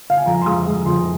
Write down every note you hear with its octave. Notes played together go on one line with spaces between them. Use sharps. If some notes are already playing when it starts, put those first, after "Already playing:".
F5
G#5
F2 A#5
C6
G#3 D#6
G#3
F2 C6